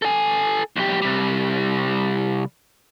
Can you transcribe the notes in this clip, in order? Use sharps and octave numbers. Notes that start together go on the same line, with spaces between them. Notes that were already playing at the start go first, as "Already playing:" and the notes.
A4 G#5
B1 G4
C3 G3